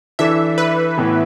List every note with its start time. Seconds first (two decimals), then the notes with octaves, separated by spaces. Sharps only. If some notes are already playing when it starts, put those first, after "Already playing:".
0.19 E3 D4 A4 E5
0.58 B4
0.97 A2 E3 B3